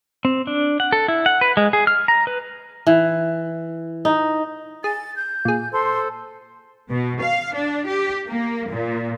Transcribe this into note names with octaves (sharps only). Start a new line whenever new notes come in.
C4
D4
F#5
A4
E4
F#5
B4
G#3
G#4
F6
A#5
B4
E3
D#4
G#4 A6
G6
A#2 G#4
A4 C5 C6
B2
F5
D4
G4
A#3
A#2